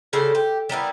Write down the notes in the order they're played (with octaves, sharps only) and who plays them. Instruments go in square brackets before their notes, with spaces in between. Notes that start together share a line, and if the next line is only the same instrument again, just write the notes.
[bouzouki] C#3 G3 A4 C5
G4
G3 A#3 B3 E4